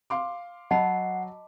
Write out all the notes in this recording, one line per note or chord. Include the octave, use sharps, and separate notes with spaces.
F5 C6 D6
F#3 D#5 F#5 A5 B5 C7